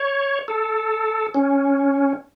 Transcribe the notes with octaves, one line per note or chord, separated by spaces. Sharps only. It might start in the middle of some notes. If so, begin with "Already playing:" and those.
Already playing: C#5
A4
C#4